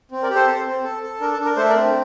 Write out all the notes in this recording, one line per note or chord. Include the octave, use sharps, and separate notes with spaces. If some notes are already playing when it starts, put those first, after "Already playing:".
C4
A#4 D5
G4
A4 C5
C4
C4
A4
A4
D4 A#4
A4
D4
A#4
A3 A4 C5
A#4 D5
C4